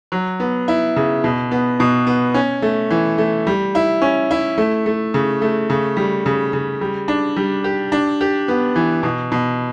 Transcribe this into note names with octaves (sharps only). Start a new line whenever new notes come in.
F#3
B3
E4
C#3
B2
B3
B2
B3
C#4
A3
E3
A3
G3
E4
C#4
E4
A3
A3
C#3
A3
C#3
G3
C#3
C#3
G3
D4
G3
G4
D4
G4
B3
E3
B2
B2